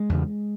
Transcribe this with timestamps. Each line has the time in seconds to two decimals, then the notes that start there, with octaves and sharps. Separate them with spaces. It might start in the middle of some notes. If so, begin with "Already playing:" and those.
Already playing: G#3
0.09 E2 C#3